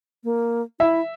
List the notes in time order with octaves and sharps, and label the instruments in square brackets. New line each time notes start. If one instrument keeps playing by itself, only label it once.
[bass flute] A#3
[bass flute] E4 [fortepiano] E5